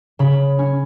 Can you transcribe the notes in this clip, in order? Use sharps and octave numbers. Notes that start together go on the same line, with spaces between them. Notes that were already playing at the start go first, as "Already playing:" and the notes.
C#3 B5
C#4